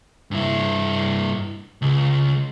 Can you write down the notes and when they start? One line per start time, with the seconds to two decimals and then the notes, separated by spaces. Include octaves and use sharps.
0.31 G2 E4
1.82 C#2